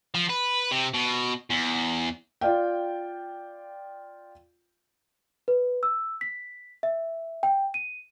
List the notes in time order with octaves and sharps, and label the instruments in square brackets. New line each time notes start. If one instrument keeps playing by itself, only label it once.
[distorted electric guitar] F3
B4
C3
B2
E2
[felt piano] F4 D5 F5 G5
[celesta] B4
E6
B6
E5
G5
D#7